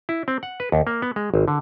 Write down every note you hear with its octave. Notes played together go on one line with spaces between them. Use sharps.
E4
C4
F#5
B4
D#2
A#3
B3
G#3
G#1
D3